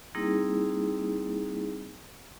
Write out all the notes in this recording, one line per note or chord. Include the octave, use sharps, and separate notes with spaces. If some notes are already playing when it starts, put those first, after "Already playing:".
G3 A#3 C4 D#4 E4 G#4